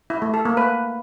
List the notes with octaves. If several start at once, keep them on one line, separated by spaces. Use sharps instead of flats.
E4
A3
A4
A#3
B4